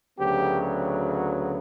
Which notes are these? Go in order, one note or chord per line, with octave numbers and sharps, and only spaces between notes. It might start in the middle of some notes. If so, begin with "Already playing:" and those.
D2 C#3 F#3 B3 G4